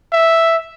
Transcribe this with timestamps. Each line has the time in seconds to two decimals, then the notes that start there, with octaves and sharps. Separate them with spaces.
0.12 E5